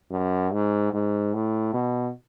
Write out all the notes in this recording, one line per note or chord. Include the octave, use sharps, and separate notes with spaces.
F#2
G#2
G#2
A2
B2